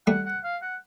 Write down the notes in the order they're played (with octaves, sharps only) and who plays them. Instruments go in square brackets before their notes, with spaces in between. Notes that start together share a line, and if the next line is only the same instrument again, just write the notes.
[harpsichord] G3 A3 [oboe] F#5
[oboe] F#5
F5
F#5